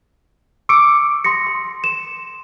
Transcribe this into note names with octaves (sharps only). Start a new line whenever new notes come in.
C#6 D6 E6 C#7 D7
C6 D#6 A#6 C#7
C6
E7